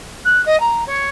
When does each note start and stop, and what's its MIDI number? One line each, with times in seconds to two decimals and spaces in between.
0.25 0.44 90
0.46 0.60 75
0.60 0.84 82
0.86 1.09 73